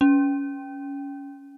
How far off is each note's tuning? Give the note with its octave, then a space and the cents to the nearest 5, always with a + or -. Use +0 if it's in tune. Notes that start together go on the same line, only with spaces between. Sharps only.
C#4 +15